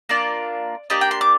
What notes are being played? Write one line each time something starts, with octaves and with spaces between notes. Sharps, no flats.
A#3 D4 F4 D5
A#3 D4 G4 D#5
G5
C6
D6